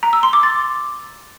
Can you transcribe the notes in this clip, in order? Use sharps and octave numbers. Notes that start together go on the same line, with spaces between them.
A#5
E6
C6
D6
A6